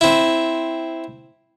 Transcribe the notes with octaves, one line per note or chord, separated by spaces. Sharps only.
C4 E4